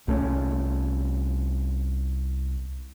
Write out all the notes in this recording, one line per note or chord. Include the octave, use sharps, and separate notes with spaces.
C2 A3 C#4